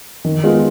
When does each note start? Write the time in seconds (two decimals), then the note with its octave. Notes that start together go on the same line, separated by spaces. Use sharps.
0.25 D#3
0.44 G#3 B3 F4